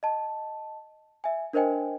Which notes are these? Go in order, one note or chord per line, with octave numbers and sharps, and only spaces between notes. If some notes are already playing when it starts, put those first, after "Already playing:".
D#5 A5
E5 G#5
D4 A#4 C5 D#5 G5 G#5